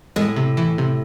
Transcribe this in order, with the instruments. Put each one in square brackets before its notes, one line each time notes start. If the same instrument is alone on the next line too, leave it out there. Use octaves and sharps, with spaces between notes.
[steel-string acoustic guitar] A2 [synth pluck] G#3
[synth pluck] C3
E3
C3